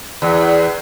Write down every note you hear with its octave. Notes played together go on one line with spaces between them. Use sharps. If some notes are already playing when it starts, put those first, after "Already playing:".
E2